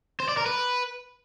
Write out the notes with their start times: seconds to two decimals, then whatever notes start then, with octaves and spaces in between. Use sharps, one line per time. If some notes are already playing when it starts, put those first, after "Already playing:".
0.20 C5
0.29 D5
0.37 A#4
0.46 B4